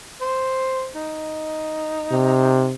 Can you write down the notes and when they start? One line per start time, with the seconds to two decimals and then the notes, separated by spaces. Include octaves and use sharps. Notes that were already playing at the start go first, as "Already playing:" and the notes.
0.21 C5
0.95 D#4
2.11 C3